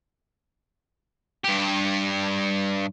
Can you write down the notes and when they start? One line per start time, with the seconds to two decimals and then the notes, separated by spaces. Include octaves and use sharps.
1.44 G2 G4